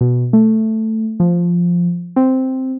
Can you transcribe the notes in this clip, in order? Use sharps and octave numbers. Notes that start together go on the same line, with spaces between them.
B2
A3
F3
C4